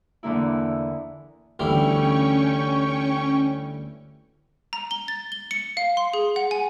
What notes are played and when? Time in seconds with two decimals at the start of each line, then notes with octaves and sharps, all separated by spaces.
0.23 E2 D3 A#3 E4
1.59 D2 E3 G3 C#4 G5 C#6
4.73 A#5
4.91 G7
5.08 A6
5.32 G7
5.51 C#7
5.77 F5
5.97 C6
6.14 G#4
6.36 F#5
6.51 G#5